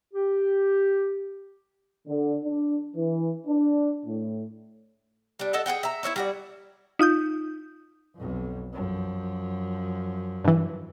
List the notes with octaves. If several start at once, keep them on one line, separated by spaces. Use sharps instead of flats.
G4
D3
D4
E3
D4
A2
G3 D4
A4 D#5 E5 F#5
G#4 B4 F#5 G5
E5 A#5
E4 A#4 C#5 E5
G3 F#4 D5
D#4 F4 D#6 G6
B1 F2
F#2 F3
G2 E3